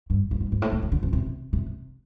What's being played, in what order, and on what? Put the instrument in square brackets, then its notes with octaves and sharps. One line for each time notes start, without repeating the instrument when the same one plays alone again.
[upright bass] G2
G2
G#2
G#2
A2
A2
D#3
D3
C#3
C3
C3